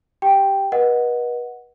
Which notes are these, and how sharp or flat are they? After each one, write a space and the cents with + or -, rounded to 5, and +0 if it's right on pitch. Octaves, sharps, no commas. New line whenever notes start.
G4 +0 G5 +0
B4 -40 D#5 +0 F#5 -5